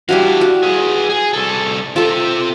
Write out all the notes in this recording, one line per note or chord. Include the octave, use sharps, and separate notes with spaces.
G3 D4 E4 F#4 F5
F#4
G#4 B4
G#4
C2 A4
C4 F4 A4 E5